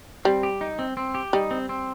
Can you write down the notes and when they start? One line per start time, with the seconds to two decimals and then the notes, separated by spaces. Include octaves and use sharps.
0.25 G3 C4
0.43 G4
0.61 D#4
0.79 C4
0.97 C4
1.15 G4
1.33 G3 D#4
1.51 C4
1.69 C4